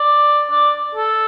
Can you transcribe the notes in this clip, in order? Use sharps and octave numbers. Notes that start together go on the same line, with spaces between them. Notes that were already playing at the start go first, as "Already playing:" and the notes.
Already playing: D5
D5
A4